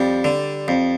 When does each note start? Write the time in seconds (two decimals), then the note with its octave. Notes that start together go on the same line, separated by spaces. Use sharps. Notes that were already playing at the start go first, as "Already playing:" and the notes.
Already playing: F2 G3
0.24 D3
0.68 F2